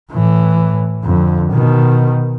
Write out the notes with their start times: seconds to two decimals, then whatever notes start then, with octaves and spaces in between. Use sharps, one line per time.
0.11 A2 E3
1.04 F2 D3
1.53 B2 D#3